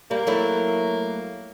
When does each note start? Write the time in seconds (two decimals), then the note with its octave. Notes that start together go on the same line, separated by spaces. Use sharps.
0.11 G3 A#3
0.27 F#3 A3 E4